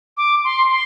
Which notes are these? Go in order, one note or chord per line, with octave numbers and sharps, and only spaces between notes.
D6
C6
C6